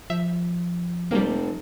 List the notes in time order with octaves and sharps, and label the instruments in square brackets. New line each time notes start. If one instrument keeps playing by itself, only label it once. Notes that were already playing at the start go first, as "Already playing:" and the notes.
[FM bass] F3 [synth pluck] E5
[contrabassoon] F1 [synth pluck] G3 A#3